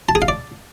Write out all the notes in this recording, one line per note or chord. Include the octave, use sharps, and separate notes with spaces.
A5
G#4
F5
D5